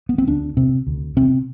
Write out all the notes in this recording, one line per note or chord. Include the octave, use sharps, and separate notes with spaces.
B3
C4
D2 D4
C3 C4
D2
C3 C4